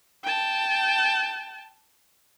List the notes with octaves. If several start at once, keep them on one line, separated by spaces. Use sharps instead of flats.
G5 A5